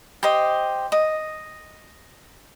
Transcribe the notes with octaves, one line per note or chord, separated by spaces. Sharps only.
G4 C5 D#5
D#5